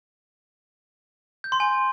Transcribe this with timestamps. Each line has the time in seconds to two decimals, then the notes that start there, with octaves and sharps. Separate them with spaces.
1.44 G6
1.52 C6
1.60 G#5